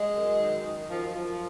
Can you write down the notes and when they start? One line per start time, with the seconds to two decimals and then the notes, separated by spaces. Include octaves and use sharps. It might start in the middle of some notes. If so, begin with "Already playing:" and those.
Already playing: G#3
0.12 F#2
0.38 D#3
0.64 D#3
0.89 F#2 F3
1.14 F#2 F3